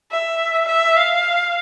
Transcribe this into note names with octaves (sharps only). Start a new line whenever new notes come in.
E5
E5
F5